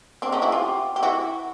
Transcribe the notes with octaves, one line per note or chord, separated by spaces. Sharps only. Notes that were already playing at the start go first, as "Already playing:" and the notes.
C4 D4
C#4 D#4
E4 F#4
F4 G4
G4
E4 F#4